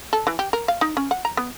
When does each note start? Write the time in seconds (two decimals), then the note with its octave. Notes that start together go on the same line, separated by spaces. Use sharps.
0.13 A4
0.27 E3
0.39 G4
0.53 A#4
0.68 F5
0.81 D#4
0.97 C#4
1.11 F#5
1.25 A#5
1.37 B3